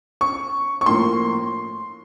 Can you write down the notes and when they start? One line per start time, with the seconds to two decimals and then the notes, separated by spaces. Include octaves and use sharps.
0.21 C#6
0.81 C#6
0.86 A2 F3 A#3 C6